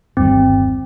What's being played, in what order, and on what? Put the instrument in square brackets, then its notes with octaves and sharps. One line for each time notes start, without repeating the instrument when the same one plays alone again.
[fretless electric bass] G1 D#2 G3 [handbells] C4